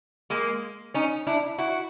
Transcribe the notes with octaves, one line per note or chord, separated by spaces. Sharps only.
G#3 A#3
C#4 D#4
D4 E4
E4 F#4